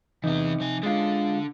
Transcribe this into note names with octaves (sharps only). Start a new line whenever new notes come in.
C3 E3 B3 D#4
F3 G#5
D3 G#3 D4 F4